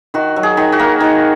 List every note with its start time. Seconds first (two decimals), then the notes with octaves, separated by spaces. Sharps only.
0.14 D#3 F#4
0.36 F#3
0.43 G#4
0.57 D#3
0.72 F#4
0.79 A#3
1.00 D#3